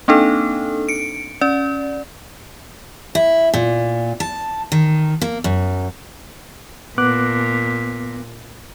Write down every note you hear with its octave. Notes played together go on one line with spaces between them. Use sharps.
A#3 C4 D4 D#4 A4
C#7 D7
C#4 D5
E4
A#2
A5
D#3
A#3
F#2
A#2 B3 D6 F#6